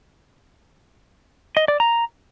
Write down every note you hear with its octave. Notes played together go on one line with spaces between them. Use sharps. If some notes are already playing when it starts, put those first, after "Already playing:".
D#5
D5
A#5